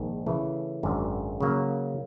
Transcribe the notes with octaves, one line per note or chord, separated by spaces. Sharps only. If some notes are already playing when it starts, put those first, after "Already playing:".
Already playing: A#1 G#2 D#3
C#3 E3 A3
G#1 F#2 D3
C#3 F#3 A#3